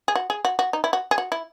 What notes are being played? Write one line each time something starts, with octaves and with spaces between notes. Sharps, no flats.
G#4
F#4
G#4
F#4
F#4
D#4
E4
F#4
G#4
F#4
E4